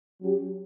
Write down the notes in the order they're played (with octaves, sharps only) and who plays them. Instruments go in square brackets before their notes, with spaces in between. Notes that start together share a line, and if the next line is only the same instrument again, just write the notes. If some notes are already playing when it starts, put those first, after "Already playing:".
[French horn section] F#3 C#4 G4